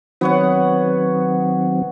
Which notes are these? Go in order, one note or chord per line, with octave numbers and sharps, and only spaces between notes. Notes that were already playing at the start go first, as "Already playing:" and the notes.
D#3 F#3 B3 C4 C#5 F#5